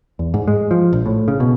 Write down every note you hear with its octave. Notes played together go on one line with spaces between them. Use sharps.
E2
G#2
G#3
F3
A#1
A2
C#3
B2